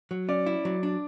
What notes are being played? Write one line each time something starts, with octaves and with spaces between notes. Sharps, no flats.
F#3
C#4 D5
E4
F#3
D4